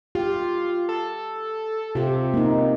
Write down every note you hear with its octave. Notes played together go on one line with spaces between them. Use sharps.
F4 G4
A4
C3 F4 G4
A#3 D#4